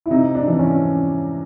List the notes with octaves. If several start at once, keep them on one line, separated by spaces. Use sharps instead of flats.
E4
C3 D#4
D4
E3
C#4